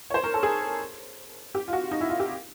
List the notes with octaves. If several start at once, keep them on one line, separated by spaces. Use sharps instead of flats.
C#5
C5
A#4
A4
G#4
G4
F4
F#4
D#4
E4
F4
G4